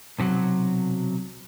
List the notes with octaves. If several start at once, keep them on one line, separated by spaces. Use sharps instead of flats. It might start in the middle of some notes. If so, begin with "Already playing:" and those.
B1 C3 F3 F#3